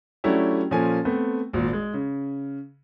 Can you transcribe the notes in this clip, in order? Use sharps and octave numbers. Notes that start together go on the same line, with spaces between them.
F#3 A3 C#4 D4 E4 G4
A#2 F3 C#4 A4 G#5
A3 B3 C4
G#1 A#2
G#3
C#3